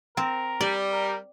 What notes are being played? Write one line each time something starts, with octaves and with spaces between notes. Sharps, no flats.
C4 A#4
G3 D5
A#4